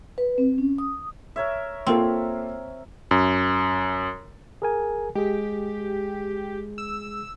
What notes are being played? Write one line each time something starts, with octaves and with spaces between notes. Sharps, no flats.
B4
C4
C#4
D#6
A#4 C#5 E5
A#3 C4 F4 A4
F#2
G#4 A#4 G#5
G#3 G4 G#4
E6